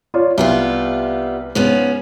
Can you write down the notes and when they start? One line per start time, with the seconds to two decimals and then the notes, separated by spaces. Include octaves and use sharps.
0.14 F4 C#5 D5
0.38 C2 G3 B3 F4
1.55 G#2 F3 B3 C#4